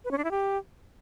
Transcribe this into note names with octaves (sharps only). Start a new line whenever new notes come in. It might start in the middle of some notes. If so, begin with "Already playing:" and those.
B4
C#4
D4
E4
G4